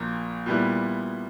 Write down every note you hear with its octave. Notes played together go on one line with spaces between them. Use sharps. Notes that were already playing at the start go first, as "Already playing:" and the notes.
Already playing: A#1 A#2 A#3
A#2 G3 B3 E4